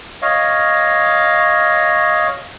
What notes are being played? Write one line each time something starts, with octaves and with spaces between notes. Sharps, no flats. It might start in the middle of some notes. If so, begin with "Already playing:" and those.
C#5 D#5 F5